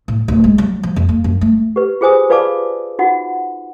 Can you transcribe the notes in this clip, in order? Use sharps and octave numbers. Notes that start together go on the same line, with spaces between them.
A2
D1
G#3
F#3
F3
F2
A#3
F#2
A3
G4 B4
F4 G#4 C5 G#5 D#6
F4 B4 D5 F5 A5 D6
D#4 F4 F#4 F#5